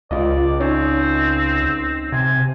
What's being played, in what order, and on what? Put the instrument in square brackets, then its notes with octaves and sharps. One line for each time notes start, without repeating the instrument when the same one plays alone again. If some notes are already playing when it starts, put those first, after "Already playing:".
[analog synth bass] C#2 [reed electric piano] F4 D#5 [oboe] D5
[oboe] C4 [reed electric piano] C#4 D#4 C#5
[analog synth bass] C3 [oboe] G#5